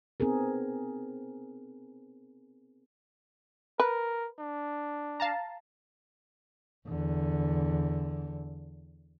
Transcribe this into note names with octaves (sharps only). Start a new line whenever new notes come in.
B3 C4 D#4 G#4 A#4
A#4 B4
D4
F5 A5 A#5
E2 D3